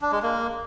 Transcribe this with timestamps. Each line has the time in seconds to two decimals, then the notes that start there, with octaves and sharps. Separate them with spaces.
0.01 D4
0.12 G#3
0.23 A#3